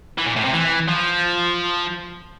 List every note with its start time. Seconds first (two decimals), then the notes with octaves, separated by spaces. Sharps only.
0.18 E3
0.27 A#2
0.36 A2
0.45 C3
0.54 E3
0.88 F3